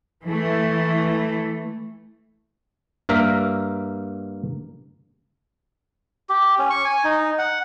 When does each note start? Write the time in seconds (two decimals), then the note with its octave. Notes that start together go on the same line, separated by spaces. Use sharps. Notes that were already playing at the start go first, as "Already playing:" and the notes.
0.25 E3 A3
3.09 G2 A#3 A#4 E5
6.29 G4
6.58 C#4
6.70 C#6
6.85 G#5
7.04 D#4
7.39 F#5